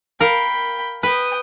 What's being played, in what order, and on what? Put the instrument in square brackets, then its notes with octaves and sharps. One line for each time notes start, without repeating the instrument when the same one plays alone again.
[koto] A#4 F5 [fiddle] G5 B5
[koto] B4 [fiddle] G5 D#6